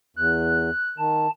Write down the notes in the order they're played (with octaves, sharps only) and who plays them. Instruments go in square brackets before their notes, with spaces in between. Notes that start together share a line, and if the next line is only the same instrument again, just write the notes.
[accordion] E2 [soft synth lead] F#6
[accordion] D#3 [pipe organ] A5